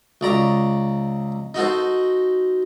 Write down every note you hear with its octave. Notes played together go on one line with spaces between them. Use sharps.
C#2 D5 A#5
D#4 F#4 A4 C5